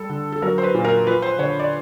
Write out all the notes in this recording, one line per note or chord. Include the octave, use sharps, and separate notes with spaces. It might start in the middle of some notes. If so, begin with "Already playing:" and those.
Already playing: G3 A4
D3
A4
F#3 A#4
C5
B4
A#2
A#4
F3 B4
C5
D3 C#5
D5